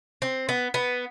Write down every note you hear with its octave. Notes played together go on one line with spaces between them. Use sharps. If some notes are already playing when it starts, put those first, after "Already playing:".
C4
B3
B3